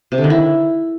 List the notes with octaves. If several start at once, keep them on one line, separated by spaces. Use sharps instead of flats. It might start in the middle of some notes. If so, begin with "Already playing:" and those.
C3
D3
D#3
E4